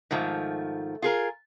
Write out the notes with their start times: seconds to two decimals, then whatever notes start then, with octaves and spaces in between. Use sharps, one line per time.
0.11 G#2 D#3 F3 A3
1.02 F4 G#4 A#4